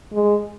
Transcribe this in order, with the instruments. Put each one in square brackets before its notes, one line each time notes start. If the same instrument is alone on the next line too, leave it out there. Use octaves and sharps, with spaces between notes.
[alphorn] G#3